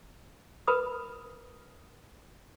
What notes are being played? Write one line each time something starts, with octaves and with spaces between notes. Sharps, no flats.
A#4 B4 B5 D#6